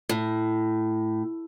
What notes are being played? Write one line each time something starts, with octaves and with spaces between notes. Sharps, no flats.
A2